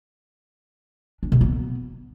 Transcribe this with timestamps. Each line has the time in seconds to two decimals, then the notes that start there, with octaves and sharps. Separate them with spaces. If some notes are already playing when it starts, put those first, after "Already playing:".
1.23 D4
1.32 B2
1.41 B3